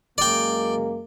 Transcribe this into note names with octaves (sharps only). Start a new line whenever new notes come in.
F#2 G#3 A#3 D5 G5